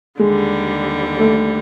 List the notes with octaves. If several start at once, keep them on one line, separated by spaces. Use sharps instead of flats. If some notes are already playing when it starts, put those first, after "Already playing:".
D#2 D3 G3 G#3
A3